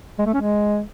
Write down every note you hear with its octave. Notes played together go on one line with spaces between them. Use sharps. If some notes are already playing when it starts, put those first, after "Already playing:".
G#3
A3
C#4
G#3